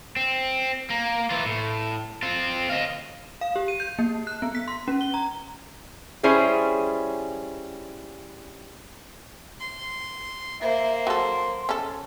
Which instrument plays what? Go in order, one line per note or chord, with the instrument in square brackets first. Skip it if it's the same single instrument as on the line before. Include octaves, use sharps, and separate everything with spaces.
[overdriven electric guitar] C4
A#3
E3 F4
A2
C4 F4
D#5 F5
[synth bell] F5
G4
D#7
G6
A#3
F#6
B3
B6
C6
C#4
G7
A#5
[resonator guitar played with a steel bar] G3 C#4 E4 G#4 C5 C#5
[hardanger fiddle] C6
[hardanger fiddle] A#3 C5 [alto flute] E5
[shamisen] F#3 A4 [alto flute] C6
[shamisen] C#4 A4